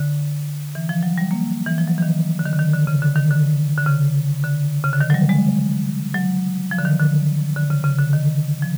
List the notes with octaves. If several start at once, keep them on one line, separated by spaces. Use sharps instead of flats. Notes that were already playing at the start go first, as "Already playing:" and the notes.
Already playing: D3
E3
F3
F#3
G3
A#3
E3
F3
F#3
E3
D#3
D3
D#3
D3
D#3
D3
C#3
D3
D#3
D3
D3
C#3
D3
C#3
D3
D#3
F#3
G3
G#3
F#3
F3
D3
D#3
D3
D3
C#3
C#3
D3
D#3
F3